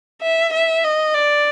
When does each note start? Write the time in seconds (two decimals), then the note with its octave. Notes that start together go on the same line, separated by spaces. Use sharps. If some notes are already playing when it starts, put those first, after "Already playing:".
0.22 E5
0.53 E5
0.84 D#5
1.14 D5